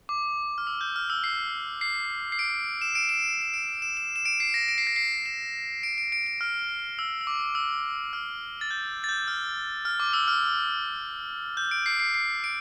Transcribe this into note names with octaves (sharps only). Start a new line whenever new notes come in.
D6
F6
E6
G6
F6
E6
C7
C7
C7
D7
E7
D7
E7
E7
D7
E7
E7
E7
D7
C7
A#6
D7
C7
A#6
C7
E7
D7
D7
D7
D7
F6
E6
E6
D6
E6
F6
A6
G6
A6
G6
F6
F6
D6
E6
F6
G6
D7
C7
C7
C7
D7